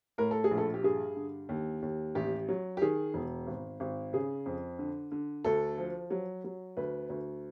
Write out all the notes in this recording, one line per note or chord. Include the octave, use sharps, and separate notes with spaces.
A2 A#4
A4
G#4
A#1
A4
G4
G2 G#4
D3
D#2
D#2
A1 G4
F#3
G4
D#3 G#4
E1
G#1
G#1
C#3 G#4
F2
D3
D3
D2 A4
F3
F#3
F#3
D2 B4
D2